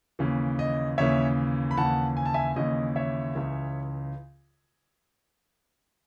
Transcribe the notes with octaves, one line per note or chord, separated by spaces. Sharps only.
D#2 C#3 E3
D#5
D#2 C#3 E3 C#5 E5
B5
D#2 C#3 E3 F#5 A5
G#5
A5
E5 G#5
D#2 C#3 E3 D#5
C#5 E5
C#2 C#3 E3